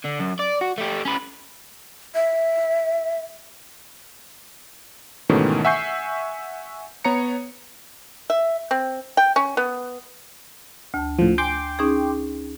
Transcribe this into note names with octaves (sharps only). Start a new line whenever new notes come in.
D3
F#2
D5
F#4
A3 G4
C#4 B4
E5
G#2 B2 D#3 E3 A3 C#4
E5 F#5 G#5 C#6 G6 C7
B3 C#5 A#5 C#7
E5
C4
G5
C#4
B3
D2 A5
A2 F3
G5 G#5 C6 D6
C#4 D#4 G#4